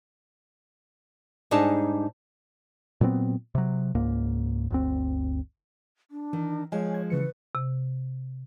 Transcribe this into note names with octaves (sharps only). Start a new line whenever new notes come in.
G#2 G3 D4 D#4 G#4 A5
A#2 F#3 B3 C4
C3 F#3
C#2 G#2 A#3
G1 D2 C4
D4
D#3 E3
F3 G#3 C#5 D#5 G#5
G#6
C#3 E3 B4 C#7
C3